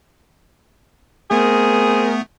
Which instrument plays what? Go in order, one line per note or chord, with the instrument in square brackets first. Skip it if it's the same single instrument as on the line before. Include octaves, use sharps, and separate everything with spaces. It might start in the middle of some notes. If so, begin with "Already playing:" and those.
[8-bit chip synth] A3 B3 [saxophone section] C4 G#4 A#4